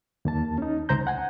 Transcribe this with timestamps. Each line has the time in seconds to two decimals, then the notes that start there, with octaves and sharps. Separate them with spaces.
0.25 D#2 A#3 A5
0.58 C#4 D#4
0.89 C#2 C5 A#5 G6
1.07 F#5 G#5